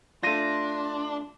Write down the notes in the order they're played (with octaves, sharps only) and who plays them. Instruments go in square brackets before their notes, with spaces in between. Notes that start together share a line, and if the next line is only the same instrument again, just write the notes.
[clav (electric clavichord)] A3 F4 [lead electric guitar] D4 [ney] C6 [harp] A#6 D#7